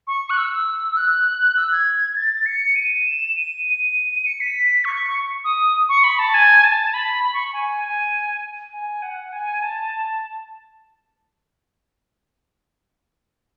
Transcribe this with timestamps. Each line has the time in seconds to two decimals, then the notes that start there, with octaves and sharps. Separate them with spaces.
0.07 C#6
0.30 F#6
0.38 E6
0.97 F#6
1.57 E6
1.72 G#6
2.16 A6
2.46 C#7
2.76 D#7
3.06 E7
3.36 D#7
3.66 D#7
4.26 C#7
4.41 B6
4.85 C#6
5.45 D#6
5.89 C#6
6.04 B5
6.19 A5
6.34 G#5
6.64 A5
6.94 B5
7.24 B5
7.34 C#6
7.53 G#5
7.84 G#5
8.73 G#5
9.02 F#5
9.32 G#5
9.62 A5